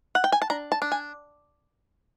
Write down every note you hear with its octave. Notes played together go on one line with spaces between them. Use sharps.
F#5
G5
G#5
A5
D4 A#5
A5
D4
G#5